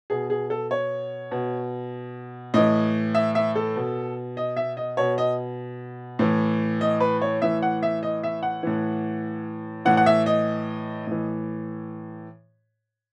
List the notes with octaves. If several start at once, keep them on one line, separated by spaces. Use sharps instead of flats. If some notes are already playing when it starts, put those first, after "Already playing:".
B2 G#4
G#4
A4
C#5
B2
A2 E3 D#5
E5
E5
A4
B2
D#5
E5
D#5
B2 C#5
D#5
A2 E3
D#5
B4
C#5
A2 E3 E5
F#5
E5
D#5
E5
F#5
A2 E3
A2 E3 F#5
F#5
E5
D#5
A2 E3